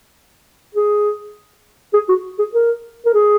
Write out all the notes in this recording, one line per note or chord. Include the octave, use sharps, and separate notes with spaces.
G#4
G#4
F#4
G#4
A#4
A#4
G#4